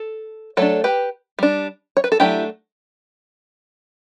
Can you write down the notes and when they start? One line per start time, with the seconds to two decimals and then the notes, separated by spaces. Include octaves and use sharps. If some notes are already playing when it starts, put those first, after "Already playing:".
Already playing: A4
0.57 F#3 A3 D4 A4 C#5
0.84 G4 B4
1.39 G3 D4
1.97 C#5
2.04 B4
2.12 A4
2.20 F#3 A3 D4 E4 G4